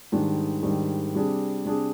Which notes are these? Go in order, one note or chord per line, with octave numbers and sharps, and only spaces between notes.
G#2 D#3 G3 D4
G#2 D#3 G3 D4
C3 G3 D4 G#4
C3 G3 D4 G#4